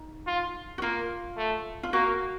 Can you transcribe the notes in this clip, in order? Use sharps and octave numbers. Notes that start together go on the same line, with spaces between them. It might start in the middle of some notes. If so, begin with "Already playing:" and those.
Already playing: D#4
F4
F#4
A#3 F4
A3
F4
A#3 F#4